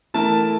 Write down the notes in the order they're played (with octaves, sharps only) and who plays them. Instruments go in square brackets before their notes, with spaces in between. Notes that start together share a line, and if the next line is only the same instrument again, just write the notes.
[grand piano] E3 A3 E4 A#4 [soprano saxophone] A5